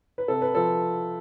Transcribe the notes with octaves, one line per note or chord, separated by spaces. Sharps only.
B4
C3 A4
B4
F3 A4